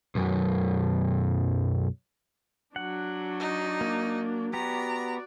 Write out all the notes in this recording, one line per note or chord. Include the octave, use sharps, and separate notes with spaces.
B1 F#2
F#3 D4 F#5
D#4
A#3
B3 F#4 G4 D5 A#5